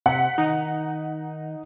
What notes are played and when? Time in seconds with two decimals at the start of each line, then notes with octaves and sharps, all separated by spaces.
0.06 C3 F#5 B6
0.38 D#3 D#4